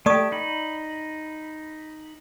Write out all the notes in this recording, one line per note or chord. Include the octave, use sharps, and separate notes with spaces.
A3 G4 D5 C#6 D#6
D#4 B5